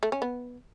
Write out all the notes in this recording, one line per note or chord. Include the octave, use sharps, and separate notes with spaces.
A3
C#4
B3